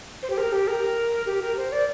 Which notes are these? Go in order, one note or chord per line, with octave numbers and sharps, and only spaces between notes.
C5
G4
A#4
G4
A#4
G4
A#4
C5
D5